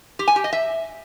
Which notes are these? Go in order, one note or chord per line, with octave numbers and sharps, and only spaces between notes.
G4
G#5
G4
D#5
E5